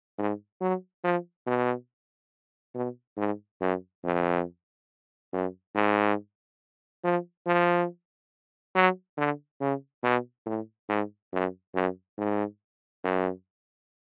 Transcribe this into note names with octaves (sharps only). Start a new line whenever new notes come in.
G#2
F#3
F3
B2
B2
G#2
F#2
F2
F#2
G#2
F3
F3
F#3
D3
C#3
B2
A2
G#2
F#2
F#2
G#2
F#2